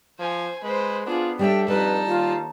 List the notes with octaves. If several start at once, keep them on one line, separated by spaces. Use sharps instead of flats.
F3 C5 G#5
G#3 B4 C5
B3 D4 F4 G#4
G3 D4 A4 C#5 E5 G5
F2 G3 D#4 B4 A5
D#2 F4